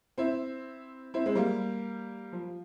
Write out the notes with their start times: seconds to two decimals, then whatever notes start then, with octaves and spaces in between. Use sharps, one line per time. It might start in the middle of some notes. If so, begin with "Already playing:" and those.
0.18 C4 E4
1.14 C4 E4
1.26 G#3 C4
1.35 G3 A#3
2.33 F3